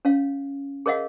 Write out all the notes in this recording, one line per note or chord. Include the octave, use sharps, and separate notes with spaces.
C#4 C#5 F5
G#4 A#4 C#5 D#5 F5 F#5